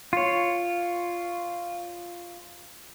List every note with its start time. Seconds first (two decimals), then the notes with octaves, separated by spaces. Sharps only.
0.13 F4 C#5